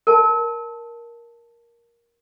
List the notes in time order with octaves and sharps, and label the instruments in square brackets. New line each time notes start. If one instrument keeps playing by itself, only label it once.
[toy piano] A#4 A5